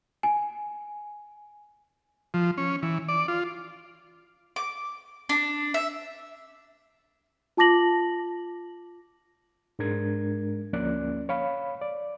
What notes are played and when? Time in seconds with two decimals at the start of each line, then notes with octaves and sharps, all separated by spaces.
0.23 G#5
2.34 F3
2.58 C#4
2.83 E3
3.08 D5
3.28 F4
4.56 D6
5.29 D4
5.74 E5
7.57 F4 A5 D6 A#6 F#7
9.79 G#2 G#3 D4 A#4 G#6
10.73 D2 F3 A#3 C#4 D5 F#6
11.29 C#5 F5 B5
11.81 D5